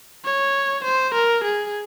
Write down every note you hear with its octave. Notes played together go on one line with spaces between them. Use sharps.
C#5
C5
A#4
G#4